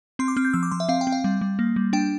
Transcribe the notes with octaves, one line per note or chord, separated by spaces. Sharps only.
C4 C6
D6
C4 F6
G6
F3 E6
D6
F3 C6
E5
C4 F5
G5
C4
F5
G3
G3
A#3
G3
D4 G5